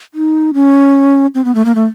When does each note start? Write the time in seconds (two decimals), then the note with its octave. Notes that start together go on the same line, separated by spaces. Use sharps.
0.14 D#4
0.54 C#4
1.35 C4
1.45 B3
1.55 A3
1.65 A#3
1.75 A3